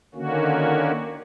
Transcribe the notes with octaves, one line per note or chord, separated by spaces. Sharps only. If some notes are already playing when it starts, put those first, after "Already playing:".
D3 D#3 A#3 C#4 F#4